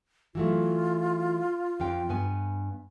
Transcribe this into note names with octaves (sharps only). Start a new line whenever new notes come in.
E3 F#3 A3 F4
F2 F5 G5
G2 B3 G#5